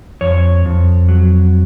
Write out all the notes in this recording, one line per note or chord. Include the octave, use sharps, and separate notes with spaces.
F2 C#5
F2
F#3